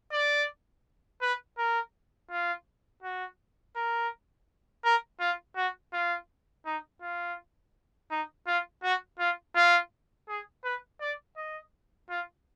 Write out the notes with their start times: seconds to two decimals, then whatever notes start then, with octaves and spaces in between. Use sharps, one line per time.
0.12 D5
1.22 B4
1.58 A#4
2.30 F4
3.03 F#4
3.76 A#4
4.84 A#4
5.20 F4
5.56 F#4
5.93 F4
6.65 D#4
7.02 F4
8.11 D#4
8.47 F4
8.83 F#4
9.19 F4
9.56 F4
10.28 G#4
10.64 B4
11.00 D5
11.37 D#5
12.10 F4